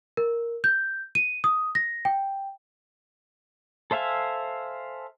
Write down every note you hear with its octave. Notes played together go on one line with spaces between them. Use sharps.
A#4
G6
D#7
D#6
A#6
G5
A4 C5 E5 F5 G#5